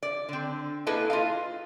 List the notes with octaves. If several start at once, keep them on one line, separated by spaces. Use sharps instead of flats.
D5
D3 C4
A#3 E4 G#4 A4 B4 D#5
F4 D#5 F5